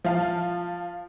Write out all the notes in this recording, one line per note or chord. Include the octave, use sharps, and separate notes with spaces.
F3 F5 A5